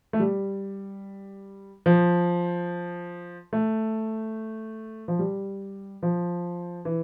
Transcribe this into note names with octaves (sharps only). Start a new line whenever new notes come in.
A3
G3
F3
A3
F3
G3
F3
E3